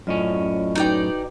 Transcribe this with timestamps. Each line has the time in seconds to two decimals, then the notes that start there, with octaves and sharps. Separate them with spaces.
0.07 F#2 A2 C#4 F4 D5 D#5
0.75 D#4 F#4 B4 D5 G5